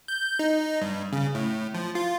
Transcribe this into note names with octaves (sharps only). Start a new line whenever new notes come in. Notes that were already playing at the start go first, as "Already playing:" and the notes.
G6
D#4
G2
C#3
A2
F3
F4